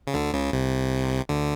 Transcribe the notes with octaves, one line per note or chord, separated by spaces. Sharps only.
C#3
D2 D3
C#2 C#3
C2 C3
D2 D3